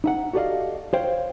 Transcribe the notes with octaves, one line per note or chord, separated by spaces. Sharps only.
D#4 E5 F#5
F#4 G4 A4 D5 D#5 F5
C5 C#5 F5 G5